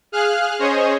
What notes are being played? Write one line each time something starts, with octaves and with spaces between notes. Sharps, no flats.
G#4 F5 F6 F#6
C#4 G#4 C5 C#5 D#5